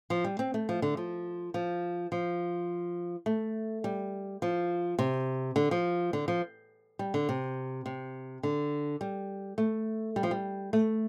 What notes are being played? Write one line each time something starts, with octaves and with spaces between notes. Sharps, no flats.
F3
G3
C4
A3
F3
D3
F3
F3
F3
A3
G3
F3
C3
D3
F3
D3
F3
G3
D3
C3
C3
D3
G3
A3
G3
F3
G3
A3